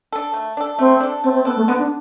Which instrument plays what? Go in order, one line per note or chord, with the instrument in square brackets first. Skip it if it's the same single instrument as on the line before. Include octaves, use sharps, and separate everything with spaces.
[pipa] D4 A4
A3
D4 A4
[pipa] A3 [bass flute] C4
[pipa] D4 A4
[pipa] A3 [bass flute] C4
[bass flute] C4
[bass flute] B3 [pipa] D4 A4
[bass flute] A3
[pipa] D3 [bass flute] B3
[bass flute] D4